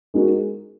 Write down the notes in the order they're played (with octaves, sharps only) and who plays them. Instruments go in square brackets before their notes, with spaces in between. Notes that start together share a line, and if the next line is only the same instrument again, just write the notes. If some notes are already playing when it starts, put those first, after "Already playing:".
[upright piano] G#3 D#4 F#4 A#4